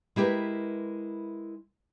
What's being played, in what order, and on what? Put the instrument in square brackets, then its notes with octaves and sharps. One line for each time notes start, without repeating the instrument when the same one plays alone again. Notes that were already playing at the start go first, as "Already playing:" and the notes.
[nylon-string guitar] G#3 E4 G4 A#4 B4